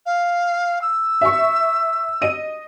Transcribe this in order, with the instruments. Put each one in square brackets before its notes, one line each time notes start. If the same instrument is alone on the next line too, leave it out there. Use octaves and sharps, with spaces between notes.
[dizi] F5
E6
[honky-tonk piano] E5 C#6
D#5 D#7